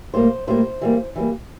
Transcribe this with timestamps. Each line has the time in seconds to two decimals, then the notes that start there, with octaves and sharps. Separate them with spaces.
0.14 A2 G3 A#3 C5
0.47 A2 G3 A#3 C5
0.81 E3 G3 A#3
1.16 E3 G3 A#3